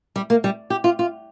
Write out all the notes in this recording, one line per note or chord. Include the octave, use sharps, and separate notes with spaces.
G3
A#3
G3
G4
F4
F4